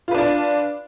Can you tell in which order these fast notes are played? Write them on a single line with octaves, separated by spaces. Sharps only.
F4 B4 D4 D5